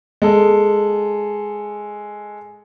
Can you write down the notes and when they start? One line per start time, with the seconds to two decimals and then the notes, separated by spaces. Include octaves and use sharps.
0.22 G#3 A4